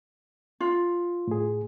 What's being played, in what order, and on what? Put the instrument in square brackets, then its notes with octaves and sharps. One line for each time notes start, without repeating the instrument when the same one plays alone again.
[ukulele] F4
[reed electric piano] A2 G#4